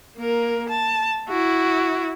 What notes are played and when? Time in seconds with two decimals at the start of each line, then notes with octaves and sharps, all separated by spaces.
0.18 A#3 A#4
0.69 A5
1.28 E4 F#4